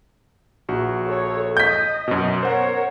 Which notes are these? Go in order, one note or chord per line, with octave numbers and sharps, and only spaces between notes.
A#1 F#4
A4 C#5
D#5 G6 B6
F#2 B2
A#4 C5 C#5 F#5